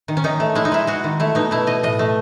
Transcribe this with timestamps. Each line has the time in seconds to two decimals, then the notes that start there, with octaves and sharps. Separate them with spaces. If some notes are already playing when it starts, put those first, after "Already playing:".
0.08 D#3
0.17 C#4
0.24 D#3 D#4
0.40 A3
0.55 G#3 E4
0.65 D#4
0.72 G#3 E4
0.87 G#3 F#4
1.04 D#3
1.20 A3 E4
1.35 B2 D#4
1.51 A3 E4
1.67 B2 D#5
1.83 A2 D#5
1.99 A3